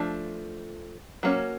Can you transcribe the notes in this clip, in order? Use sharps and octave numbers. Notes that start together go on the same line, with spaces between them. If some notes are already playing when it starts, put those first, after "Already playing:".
Already playing: F3 A3 D4
F#3 A#3 C#4